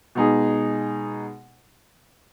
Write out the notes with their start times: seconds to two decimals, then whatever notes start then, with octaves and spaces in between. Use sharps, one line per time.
0.15 B2 G#3 D#4 G#4